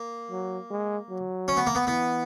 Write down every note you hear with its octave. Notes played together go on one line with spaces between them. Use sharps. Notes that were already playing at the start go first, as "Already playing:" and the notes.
Already playing: A#3
F#3
G#3
F#3
C#4
B3
A#3
B3
E3 B3